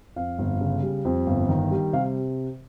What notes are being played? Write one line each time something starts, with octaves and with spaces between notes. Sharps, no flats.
F2 F5
G1
C#3
G3
F2
G1
D#3
G3
C3 F5